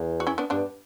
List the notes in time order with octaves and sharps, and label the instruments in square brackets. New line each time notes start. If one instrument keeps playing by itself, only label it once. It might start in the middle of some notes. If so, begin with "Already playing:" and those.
Already playing: [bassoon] E2
[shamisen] F#4
C#4 E4
B3 D4
[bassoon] G2 [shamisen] B3 D4